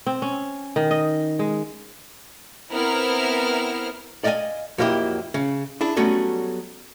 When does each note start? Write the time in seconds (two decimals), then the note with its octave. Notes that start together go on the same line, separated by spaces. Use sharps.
0.07 C4
0.22 C#4
0.76 D#3
0.91 D#5
1.39 G#3
2.70 B3 C4 E4 A#4 A#5 F6
4.24 D5 D#5 F5 G5 G#5
4.78 F2 F#3 A#3 E4 G4
5.34 C#3
5.81 D4 E4 G#4
5.96 F#3 G3 A3 B3 C#4 F#4